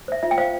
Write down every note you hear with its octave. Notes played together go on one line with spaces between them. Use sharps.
C5 E5
F4 E5
G5
C5 F5